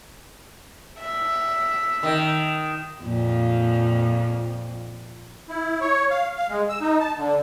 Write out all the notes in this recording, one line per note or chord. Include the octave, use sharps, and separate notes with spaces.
E5
D#3
F2 A#2 F3
E4
C#5
F5
F5
G#3
E6
D#4
A5
D3